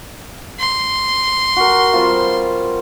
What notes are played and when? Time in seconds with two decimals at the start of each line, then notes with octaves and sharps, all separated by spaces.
0.59 C6
1.56 F#4 A#4
1.93 G3 C4 F4